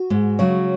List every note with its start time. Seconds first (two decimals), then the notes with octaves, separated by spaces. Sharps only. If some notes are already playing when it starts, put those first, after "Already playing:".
Already playing: F#4
0.10 G#2 G#3
0.39 C#3 F#3 C#5